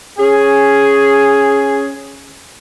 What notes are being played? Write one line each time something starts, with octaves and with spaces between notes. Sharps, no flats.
C#4 G#4